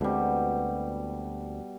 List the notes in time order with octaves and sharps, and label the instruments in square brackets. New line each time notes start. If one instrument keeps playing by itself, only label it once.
[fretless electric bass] D2 G#3 C4 [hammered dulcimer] B2 G3